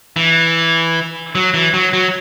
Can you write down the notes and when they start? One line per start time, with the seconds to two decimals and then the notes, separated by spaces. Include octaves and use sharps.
0.16 E3
1.35 F#3
1.54 E3
1.74 F#3
1.93 F#3